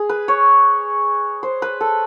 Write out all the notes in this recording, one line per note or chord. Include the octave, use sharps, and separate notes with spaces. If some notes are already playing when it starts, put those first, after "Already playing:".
Already playing: G#4
B4
C#5
C5
B4
A4